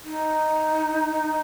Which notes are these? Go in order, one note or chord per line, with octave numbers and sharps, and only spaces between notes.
D#4